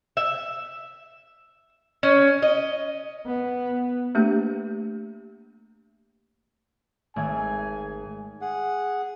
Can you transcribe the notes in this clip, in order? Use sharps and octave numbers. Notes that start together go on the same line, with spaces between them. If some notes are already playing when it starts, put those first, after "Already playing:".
E5
C#4
D#5
B3
A3 A#3 D4 G4
G#1 A3 G#5 G#6
G#4 F#5